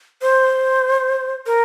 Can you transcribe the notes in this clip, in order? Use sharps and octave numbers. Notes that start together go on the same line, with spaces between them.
C5
A#4